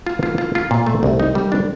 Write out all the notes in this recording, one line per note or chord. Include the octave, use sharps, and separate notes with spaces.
F4
F4
F4
F4
A#2
A3
C2
D#4
G3
D4